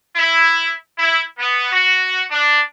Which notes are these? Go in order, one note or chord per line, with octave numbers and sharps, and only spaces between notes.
E4
E4
B3
F#4
D4